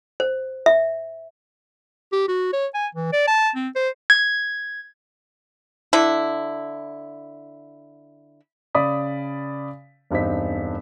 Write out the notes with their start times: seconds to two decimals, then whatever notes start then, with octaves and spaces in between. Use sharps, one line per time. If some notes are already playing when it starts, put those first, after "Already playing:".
0.20 C5
0.66 E5
2.12 G4
2.28 F#4
2.53 C#5
2.75 G#5
2.95 E3
3.13 D5
3.28 A5
3.56 C4
3.76 C5
4.10 G#6
5.93 D3 E4
8.75 C#3 D5 B5 D#6 B6
10.11 E1 G2 C4 D#4 B6